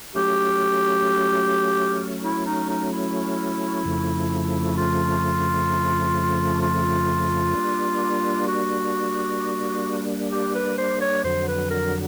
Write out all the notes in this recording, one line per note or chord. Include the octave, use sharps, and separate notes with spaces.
F#3 A3 C#4 G4
E4
D#4
D#4
E4
F2 C#3 F3 A3
F4
F4
G3 A#3 D4
F#4
G4
B4
C5
C#5
F2 D3 F#3 C5
B4
A#4